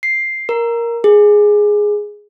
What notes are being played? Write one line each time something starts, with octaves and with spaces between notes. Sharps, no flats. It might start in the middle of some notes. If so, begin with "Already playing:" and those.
C7
A#4
G#4